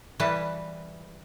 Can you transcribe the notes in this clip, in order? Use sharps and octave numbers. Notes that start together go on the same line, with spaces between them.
E3 G3 E4 B4 A5